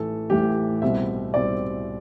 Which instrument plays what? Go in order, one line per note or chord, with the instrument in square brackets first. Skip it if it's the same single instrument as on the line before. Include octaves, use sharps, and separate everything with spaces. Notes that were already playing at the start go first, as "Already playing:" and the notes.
Already playing: [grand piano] A1 A2 E3 A3 A4
A1 A2 E3 A3 G4
C2 B2 G3 C4 E5
C2 B2 G3 C4 D5